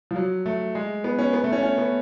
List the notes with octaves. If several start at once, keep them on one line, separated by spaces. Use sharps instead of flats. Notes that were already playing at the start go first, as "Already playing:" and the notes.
F3
F#3
A3
G#3
B3
C#4
B3
A3
C#4
C#4
B3